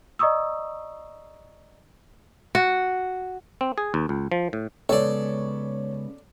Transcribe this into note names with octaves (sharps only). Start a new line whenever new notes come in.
D5 D#5 A#5 C#6 D#6 E6
F#4
C4
G#4
D#2
C#2
F3
A2
C#3 G#3 B3 A4 C#5 D5